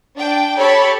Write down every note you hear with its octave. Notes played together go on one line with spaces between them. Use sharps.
D4 G5
G4 A4 C#5 B5